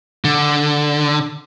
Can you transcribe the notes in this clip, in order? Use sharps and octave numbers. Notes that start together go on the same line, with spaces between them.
D3